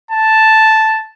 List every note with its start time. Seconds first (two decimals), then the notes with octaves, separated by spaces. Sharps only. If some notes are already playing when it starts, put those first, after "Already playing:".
0.11 A5